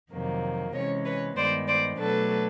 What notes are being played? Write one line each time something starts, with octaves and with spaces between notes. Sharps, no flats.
F2 C3 D#3 F#3 A#3
C3 E3 G#3 C#4 C#5 D#5
B4 C#5
G2 D#3 G#3 B3 C5 D5
C5 D5
B2 F#3 A3 D4 A4 B4